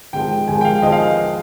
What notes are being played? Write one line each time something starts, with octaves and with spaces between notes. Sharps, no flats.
G#1 G#2 F3 G#3 G5
G#1 G#2 F3 G#3 G#5
G5
F5
G#1 F3 G#3 D#5
F5